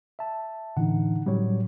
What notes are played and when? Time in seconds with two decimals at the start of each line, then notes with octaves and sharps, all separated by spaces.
0.19 E5 A5
0.77 A2 D3 E3 D#4 F#5
1.26 A2 F#3 G3 C#4 C#5